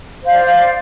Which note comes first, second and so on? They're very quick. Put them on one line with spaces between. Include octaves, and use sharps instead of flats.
C5 F5 D5